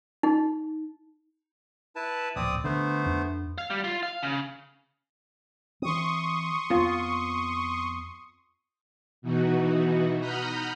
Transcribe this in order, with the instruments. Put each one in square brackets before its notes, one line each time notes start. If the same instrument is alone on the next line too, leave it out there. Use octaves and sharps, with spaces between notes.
[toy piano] D#4
[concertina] E4 B4 A5
[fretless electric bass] D1 A#1 [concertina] C4 D5 D#6
[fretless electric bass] D3 [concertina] A3 B3 C5
[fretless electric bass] F2 D4
[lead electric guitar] F5
G3
F4
F5
C#3
[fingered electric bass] E3 C4 [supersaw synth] C6 C#6 D#6
[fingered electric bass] F2 B3 C4 [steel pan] F4
[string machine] B2 E3 D#4 F#4
F#5 A#5 B5 D#6 F6 G6